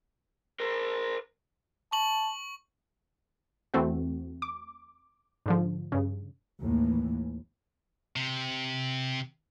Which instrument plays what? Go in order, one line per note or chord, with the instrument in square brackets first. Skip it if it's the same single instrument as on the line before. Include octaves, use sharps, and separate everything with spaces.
[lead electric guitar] A#4 C5
[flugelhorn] A5 [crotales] C#6 F#7
[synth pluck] E2 E3 A3 C4 F#4
D6
G#2 D3 F3
G2 C#3
[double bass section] D#2 A2 E3
[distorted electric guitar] C3